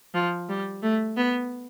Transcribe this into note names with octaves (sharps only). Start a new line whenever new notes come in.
F3
G3
A3
B3